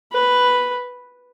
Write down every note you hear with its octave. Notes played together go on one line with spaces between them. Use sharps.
B4